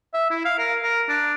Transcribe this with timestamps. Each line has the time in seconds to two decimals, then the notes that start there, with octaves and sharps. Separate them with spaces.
0.14 E5
0.31 E4
0.45 F5
0.59 A#4
0.83 A#4
1.09 D4